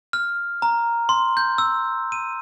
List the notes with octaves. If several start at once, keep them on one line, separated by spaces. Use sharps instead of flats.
F6
A#5
C6
G6
E6
D#7